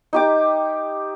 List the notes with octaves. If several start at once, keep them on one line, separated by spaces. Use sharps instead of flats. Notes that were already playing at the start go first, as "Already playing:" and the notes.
D#4 G4 D6